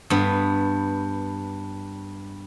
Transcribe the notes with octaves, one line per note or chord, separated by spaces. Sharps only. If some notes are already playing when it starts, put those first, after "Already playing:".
G2 B3